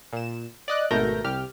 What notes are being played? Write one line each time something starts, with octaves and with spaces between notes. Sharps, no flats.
A#2 E7
D5 D#5 F#6
G#1 B2 A3 A#4 G6 A#6
C2 G4 F6